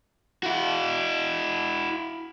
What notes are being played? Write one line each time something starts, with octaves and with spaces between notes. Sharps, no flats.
E4 F#4